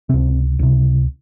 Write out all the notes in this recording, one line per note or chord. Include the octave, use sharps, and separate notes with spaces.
C#2 C3 C4
C#2 C3